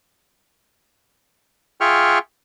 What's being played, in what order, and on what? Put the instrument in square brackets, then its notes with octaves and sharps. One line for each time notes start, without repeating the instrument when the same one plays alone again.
[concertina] F4 G#4 E5 G5 C#6 F6